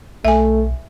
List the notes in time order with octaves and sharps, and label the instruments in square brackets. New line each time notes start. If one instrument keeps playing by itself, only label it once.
[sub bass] B1 [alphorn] A3 [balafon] E5 G#5